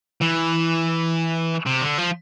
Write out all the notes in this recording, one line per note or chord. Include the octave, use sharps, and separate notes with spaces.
E3
C3
D3
F3